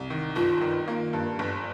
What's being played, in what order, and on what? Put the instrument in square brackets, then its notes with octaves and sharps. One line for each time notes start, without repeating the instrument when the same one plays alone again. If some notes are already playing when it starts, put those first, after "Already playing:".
Already playing: [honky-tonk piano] C2
D#3
[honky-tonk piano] G1 [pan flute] F4
[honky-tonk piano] D#3
A#3
G2
G1